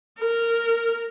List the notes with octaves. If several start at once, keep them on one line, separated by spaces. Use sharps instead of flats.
A#4